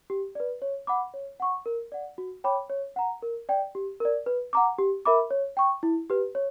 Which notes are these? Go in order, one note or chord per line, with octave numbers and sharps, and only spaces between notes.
G4
B4 D5
C#5
F#5 B5 D6
C#5
F#5 C#6
A#4
D5 F#5
F#4
C#5 G5 B5 D6
C#5
F#5 A#5
A#4
D5 G5
G4
A#4 D5
B4
F#5 A#5 D6
G4
A#4 E5 B5 D6
C#5
G5 C#6
E4
G4 B4
C#5